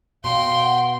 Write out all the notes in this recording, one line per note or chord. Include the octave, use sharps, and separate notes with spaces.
B2 F5 G5 C6
F#5